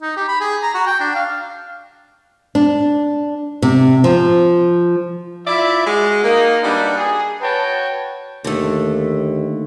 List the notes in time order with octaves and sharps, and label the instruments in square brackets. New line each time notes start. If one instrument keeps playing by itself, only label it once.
[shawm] D#4
G4
B5
G#4
A#5
F#4
G5
D4
F5
[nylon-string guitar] D4
C3
F3
[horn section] E4 F4 D5 E5
G#3 F#4
A#3 D#4
G3 D4 D#4 F#4 B4 D5
G#4
F#4 B4 C#5 G5 A5
[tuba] D#2 [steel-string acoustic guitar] D3 A3